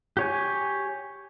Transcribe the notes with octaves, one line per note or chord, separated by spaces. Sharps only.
G4 C#5 G#5